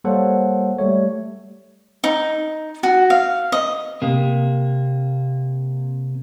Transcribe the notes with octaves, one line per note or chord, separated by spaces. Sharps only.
G3 A#3 A4 C5 C#5 F#5
G3 A3 C#5
D#4
F#4
F5
D#5
C3 A#3